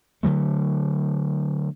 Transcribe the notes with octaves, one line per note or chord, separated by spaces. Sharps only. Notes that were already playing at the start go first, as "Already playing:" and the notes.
D3 D#3 F#3 A3